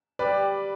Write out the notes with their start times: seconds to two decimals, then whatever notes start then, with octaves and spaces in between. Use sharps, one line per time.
0.19 G3 B4 D5